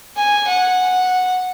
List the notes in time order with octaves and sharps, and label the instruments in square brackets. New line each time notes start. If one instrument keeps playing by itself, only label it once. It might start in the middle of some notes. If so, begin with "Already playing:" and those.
[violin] G#5
F#5